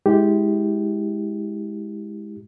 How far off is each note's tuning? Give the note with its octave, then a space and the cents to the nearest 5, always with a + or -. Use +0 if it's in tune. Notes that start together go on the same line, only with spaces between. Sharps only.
G#3 +0 E4 -30 G4 +0